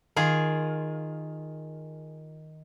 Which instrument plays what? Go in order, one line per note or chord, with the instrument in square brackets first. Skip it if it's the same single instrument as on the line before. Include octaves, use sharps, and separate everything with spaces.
[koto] D#3 F4 G#4